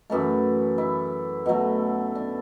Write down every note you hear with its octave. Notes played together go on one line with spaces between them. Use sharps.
F#2 E3 A3
E4
B2 F#3 A3
D4